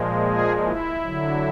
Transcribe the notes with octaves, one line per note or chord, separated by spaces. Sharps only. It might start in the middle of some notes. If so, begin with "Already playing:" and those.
Already playing: A#2 F3 G#3
G#4
E4
D3 F#3